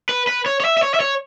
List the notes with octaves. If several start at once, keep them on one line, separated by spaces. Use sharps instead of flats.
B4
B4
C#5
C#5
E5
E5
C#5
E5
C#5